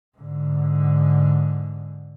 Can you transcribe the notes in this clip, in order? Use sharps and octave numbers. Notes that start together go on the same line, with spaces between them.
G#2 D3